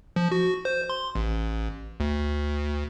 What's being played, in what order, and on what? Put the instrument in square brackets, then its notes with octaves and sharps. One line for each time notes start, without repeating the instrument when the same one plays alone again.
[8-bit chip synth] F3
F#4
C5
C6
A1
D2